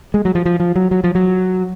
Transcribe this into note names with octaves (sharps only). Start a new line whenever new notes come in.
G#3
F#3
F3
F3
F3
F#3
F#3
F3
F#3